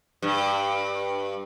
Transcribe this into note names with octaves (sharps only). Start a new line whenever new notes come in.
G2